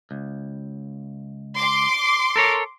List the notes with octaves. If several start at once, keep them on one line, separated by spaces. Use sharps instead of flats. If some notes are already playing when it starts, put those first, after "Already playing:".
C#2
C6 D6
A4 A#4 C#5